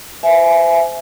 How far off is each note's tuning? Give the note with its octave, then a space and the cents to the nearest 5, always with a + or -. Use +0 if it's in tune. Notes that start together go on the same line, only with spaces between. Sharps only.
C5 -30 E5 +20 G#5 +20